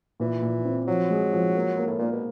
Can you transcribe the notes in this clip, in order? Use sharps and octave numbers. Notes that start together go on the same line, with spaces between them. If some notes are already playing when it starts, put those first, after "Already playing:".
A#2 E3
A#2
C4
F3 F#3
G#3
F3
A#3
A#3
A2
A#2 A#3
B2